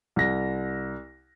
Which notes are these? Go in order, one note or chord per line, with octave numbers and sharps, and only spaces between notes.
C2 A#6